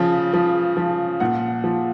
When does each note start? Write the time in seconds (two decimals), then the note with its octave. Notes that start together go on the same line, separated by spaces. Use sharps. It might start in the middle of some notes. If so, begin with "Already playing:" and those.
Already playing: C#3 F3
0.34 F3
0.77 F3
1.20 A#2 F#5
1.64 F3